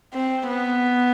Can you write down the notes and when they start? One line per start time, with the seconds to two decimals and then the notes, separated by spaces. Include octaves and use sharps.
0.14 C4
0.48 B3